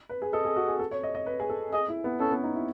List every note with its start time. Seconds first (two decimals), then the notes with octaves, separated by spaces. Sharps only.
0.09 B4
0.22 G#4
0.33 A4 D#5
0.45 G#4
0.56 F#4
0.68 G#4
0.79 A4
0.91 C#5
1.03 D#5
1.15 D#5
1.26 B4
1.40 G#4
1.50 A4
1.73 G#4 D#5
1.88 E4
2.04 B3
2.20 C#4 A4
2.31 B3
2.44 D#4
2.55 E4